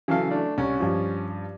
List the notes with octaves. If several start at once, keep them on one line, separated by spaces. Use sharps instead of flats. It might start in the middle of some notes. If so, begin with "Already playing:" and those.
C#3 E3 F#3 A4 F5
A3 D4
C2 C#4
G2 F3